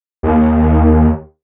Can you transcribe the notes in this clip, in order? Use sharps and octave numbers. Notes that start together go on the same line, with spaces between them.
D#2